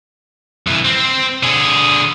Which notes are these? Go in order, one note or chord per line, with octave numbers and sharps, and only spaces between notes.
C2 E3
C4
D3 G#4